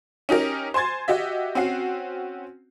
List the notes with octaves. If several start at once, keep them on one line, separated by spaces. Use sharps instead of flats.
C#4 D#4 G4 A#4
C5 G#5 C6 G#6 A6
F#4 G4 D#5 E5
C4 C#4 F#4 C7